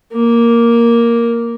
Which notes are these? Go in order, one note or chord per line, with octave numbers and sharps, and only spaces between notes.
A#3